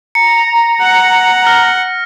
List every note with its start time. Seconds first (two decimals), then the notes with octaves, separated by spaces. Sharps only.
0.15 A#5 C#7
0.81 F#5
1.45 F6 A#6